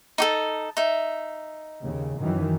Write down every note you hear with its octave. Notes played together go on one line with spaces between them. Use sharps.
D#4 G4 A4
D#4 E5
D#2 C#3
F#2 D#3 E3